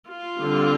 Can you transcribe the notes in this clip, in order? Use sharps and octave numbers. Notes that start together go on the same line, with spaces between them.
F4
D3 G3 C4